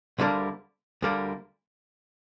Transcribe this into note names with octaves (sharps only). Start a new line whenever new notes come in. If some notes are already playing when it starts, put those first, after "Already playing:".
D2 D3 G3 A#3 D4
D2 D3 G3 A#3 D4